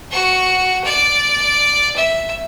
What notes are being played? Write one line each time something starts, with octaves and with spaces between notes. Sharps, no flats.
F#4 C#6
D5
E5